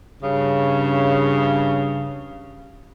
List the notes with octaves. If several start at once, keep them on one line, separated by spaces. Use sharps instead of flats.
G2 C#3